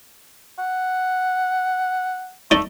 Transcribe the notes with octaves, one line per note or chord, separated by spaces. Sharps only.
F#5
A3 D#4 D5